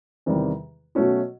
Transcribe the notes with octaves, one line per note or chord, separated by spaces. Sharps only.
E2 C3 D#3 G3
B2 F#3 A3 C#4 F#4